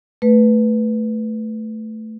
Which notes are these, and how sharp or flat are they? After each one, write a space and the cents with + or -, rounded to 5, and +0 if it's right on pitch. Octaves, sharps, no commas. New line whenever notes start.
A3 +0 B4 +0